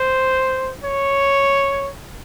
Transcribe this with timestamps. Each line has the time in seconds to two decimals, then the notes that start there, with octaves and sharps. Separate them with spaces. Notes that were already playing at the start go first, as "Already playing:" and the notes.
Already playing: C5
0.84 C#5